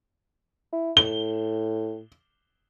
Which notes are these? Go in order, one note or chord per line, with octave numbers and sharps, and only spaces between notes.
E4
A2 G7